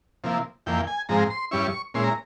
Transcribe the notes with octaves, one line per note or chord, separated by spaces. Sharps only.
C3 F3 A#3 E4
F2 E3 A#3 G5
G#5
G#2 F3 G#3 C4 A#5
C6
G2 G3 C#4 E4 C#6
A#2 G#3 C#4 E4 C6
A#5